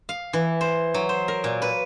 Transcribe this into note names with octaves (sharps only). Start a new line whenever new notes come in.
F5
E3
C5
F#3
C5
A#4
A#2
B4